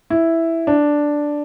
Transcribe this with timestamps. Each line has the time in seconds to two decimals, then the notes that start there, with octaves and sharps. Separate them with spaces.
0.10 E4
0.67 D4